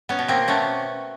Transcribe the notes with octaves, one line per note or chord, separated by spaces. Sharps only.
B3 C#4
B2
A#3 C4
A3 B3 C#4